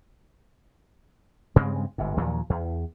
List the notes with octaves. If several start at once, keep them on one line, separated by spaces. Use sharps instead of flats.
G2 C#3 G#3 C4
G1 G#2
D#2 A#2 F3 F#3
E2